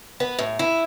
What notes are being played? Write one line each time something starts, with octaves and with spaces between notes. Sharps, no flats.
B3 B4
A2
E4 B4